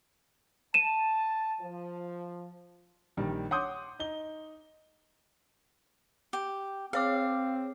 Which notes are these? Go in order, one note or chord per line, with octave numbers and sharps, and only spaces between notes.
A5 D#7 E7
F3
A#1 D#3 G3
C#5 F#5 C6 D6 D#6 G6
D#4 G7
G4
C4 G#4 C#5 F5 D6